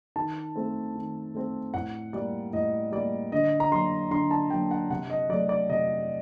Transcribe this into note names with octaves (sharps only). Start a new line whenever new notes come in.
D#3 A5
A3 C4
D#3
A3 C4
A2 F#5
G3 A#3 D5
A2 D#5
G3 A#3 D5
D3 D#5
A#5
F#3 A#3 C6
D3 C6
A5
F#3 A#3 G5
F#5
C3 F#5
D#5
F#3 A3 D5
D5
C3 D#5